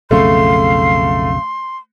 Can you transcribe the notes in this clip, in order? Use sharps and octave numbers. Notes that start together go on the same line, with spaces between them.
B1 F2 C#3 A3 F5 C6